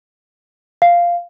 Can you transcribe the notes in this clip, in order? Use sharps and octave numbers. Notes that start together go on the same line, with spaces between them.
F5